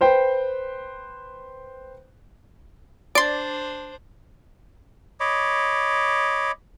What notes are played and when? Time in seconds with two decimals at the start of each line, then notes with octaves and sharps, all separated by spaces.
0.01 B4 C5 G5
3.15 D4 C5 D5 C6 D7
5.20 C#5 D#5 B5 D6